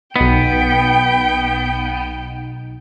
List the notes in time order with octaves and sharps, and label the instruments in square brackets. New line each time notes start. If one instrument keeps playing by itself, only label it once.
[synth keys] B1 D#4 [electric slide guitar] B3 [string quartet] G5